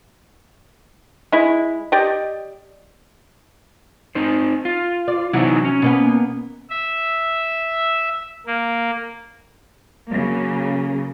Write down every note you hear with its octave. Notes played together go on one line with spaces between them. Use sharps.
G#3 E4
G4 D5 D#5
C4 D#4 C5
F4
D5
C3 E3 F#3 B3 D#4 E4
C#4
B2 A#3 B3
E5
A#3
C#3 F#3 A#3